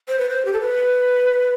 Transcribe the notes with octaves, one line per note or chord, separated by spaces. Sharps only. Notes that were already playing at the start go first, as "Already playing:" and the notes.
C5
B4
C5
G4
A4
B4